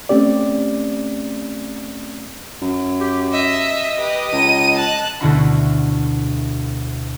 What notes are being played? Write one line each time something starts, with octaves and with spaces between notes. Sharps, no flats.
A3 C4 C#4 G4 D5
F#2
G4
D#5 E5
G4 B4
C#2 D#7
A5 F#6
D2 B2 D3 E4 F#4 B5